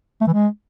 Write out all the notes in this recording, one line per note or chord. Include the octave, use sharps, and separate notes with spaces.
A3
E3
G#3